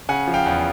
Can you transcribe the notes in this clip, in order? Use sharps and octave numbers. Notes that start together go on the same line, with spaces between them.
C#3 F#5 G#5
F3
F5 G5
E2